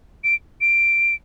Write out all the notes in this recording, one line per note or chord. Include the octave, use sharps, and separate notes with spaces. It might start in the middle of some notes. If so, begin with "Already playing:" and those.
D7
D7